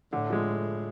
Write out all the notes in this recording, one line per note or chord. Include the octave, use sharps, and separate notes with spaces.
A2 D3
F3 G#3